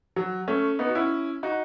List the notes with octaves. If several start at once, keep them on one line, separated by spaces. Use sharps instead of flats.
F#3
A3 C#4
B3 D#4
F#4
C#4 E4
D#4 F#4